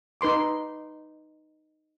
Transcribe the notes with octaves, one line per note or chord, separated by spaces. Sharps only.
D#4 B4 C6 D6